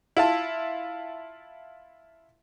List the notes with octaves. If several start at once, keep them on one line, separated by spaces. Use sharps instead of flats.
E4 F4 A5